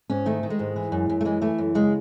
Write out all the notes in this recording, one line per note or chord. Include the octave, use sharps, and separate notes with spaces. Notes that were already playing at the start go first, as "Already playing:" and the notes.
G#2 C#4
D#3 A3
D#3
G#3
G#2
E3
F#2
F#2
A3
E3 G#3
E3 A3
F#2
C#3 G#3